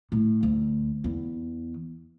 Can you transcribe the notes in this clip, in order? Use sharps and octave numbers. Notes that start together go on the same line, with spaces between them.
A2
D2
E2